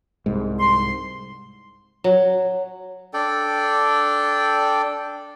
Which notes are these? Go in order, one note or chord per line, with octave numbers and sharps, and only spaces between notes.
C2 G#2
C6
F#3
D4 A4 D5 G5